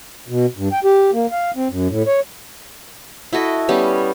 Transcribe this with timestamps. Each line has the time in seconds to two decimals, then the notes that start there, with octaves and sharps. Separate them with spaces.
0.29 B2
0.57 G2
0.72 G5
0.84 G4
1.13 A#3
1.31 F5
1.56 C4
1.70 F#2
1.89 A2
2.06 C#5
3.33 E4 F#4 A4 D#5
3.69 G3 B3 C#4 G4